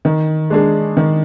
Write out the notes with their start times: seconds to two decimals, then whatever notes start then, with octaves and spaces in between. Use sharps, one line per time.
0.05 D#3
0.50 G#3 D4 G#4
0.97 D#3